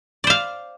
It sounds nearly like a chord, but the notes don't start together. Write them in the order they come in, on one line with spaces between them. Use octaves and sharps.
D5 C5 F5